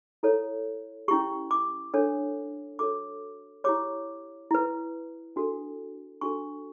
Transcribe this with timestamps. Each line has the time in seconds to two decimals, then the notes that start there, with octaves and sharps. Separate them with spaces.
0.23 E4 A4 C#5
1.08 C#4 E4 G4 C#6
1.51 D6
1.94 D4 A4 C#5
2.79 F#4 A4 C#5 D6
3.64 E4 G4 C#5 D6
4.51 E4 B4
5.36 D4 F#4 A4
6.21 D4 F#4 A4 C#6